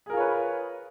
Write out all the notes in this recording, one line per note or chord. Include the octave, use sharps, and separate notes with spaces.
F4 G#4 A#4 B4 C#5